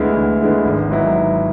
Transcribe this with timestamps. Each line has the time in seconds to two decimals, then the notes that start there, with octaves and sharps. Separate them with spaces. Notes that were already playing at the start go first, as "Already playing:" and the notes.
Already playing: D2 D3 G#3 B3 E4
0.16 D2
0.41 D3 G#3 B3 E4
0.65 G#1
0.89 G#2 F#3 B3 E4
1.14 G#1